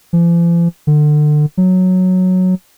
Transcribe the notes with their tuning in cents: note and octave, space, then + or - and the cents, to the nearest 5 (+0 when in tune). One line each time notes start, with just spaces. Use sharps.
F3 -45
D3 +30
F#3 -5